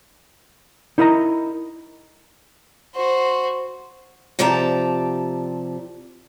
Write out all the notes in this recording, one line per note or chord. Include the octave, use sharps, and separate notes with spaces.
D#4 E4 A#4 D#5 E5 A#5
F#4 C5
C3 F3 G4 D5 A5 A#5